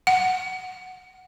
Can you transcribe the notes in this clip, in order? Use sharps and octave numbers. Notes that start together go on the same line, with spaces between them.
F#5